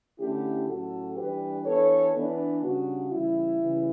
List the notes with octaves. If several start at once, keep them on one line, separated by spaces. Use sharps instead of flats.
D3 A3 C#4 E4 G4
A2 F#3 C#4 F#4 A4
E3 G3 D4 G4 B4
E3 B3 D4 A4 C#5
E3 B3 D4
C#3 G3 D4 F#4
C#3 E3 G3 E4
C#3 E3 G3